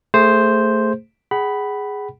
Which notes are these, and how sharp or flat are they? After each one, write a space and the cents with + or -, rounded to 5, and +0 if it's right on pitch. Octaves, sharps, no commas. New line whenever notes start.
A3 +15 G#4 -5 C5 +0
G#4 +0 F#5 +35 B5 +0